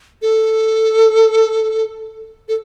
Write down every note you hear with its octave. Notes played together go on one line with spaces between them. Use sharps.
A4
A4